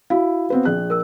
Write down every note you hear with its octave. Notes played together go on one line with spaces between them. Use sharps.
E4 F#4 F5
B3 C4 B4
A#1 G#4 F#6
A#4 E6